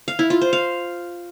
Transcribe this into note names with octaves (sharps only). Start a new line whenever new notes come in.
F5
E4
F4
C5
F5